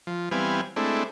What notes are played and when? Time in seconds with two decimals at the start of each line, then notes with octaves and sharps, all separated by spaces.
0.07 F3
0.31 E3 G3 B3 C4 F5 G#5
0.76 G#3 A3 C4 D4 E4